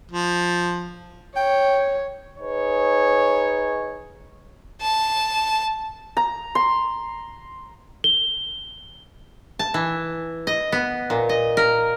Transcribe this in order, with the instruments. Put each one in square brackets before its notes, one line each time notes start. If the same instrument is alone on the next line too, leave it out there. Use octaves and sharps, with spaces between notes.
[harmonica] F3
[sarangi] C#5 [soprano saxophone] G5
[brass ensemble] D#4 G#4 B4 C#5
[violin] A5
[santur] A#5
C6
[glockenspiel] G7
[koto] A5
E3
D#5
B3
A#2
D#5
A#4